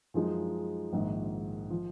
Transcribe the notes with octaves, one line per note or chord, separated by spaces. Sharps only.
F#2 F3 G#3 D#4
A#1 G#2 D#3
F3